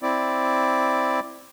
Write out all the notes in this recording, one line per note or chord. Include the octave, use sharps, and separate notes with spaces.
C4 E4 D5